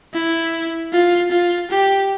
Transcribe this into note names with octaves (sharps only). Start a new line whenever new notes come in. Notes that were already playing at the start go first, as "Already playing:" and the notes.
E4
F4
F4
G4